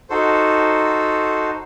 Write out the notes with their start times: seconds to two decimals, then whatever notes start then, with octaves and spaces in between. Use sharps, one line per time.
0.10 D#4 F#4 A4 C5